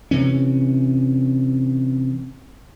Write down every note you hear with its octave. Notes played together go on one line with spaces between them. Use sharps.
C3 E3 C#4